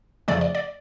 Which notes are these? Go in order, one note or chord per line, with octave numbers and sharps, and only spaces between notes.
F2 C#3 F3 A3 D5
D5
D5